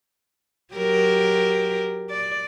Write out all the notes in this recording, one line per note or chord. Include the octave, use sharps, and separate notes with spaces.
F#3 G4 A#4
D5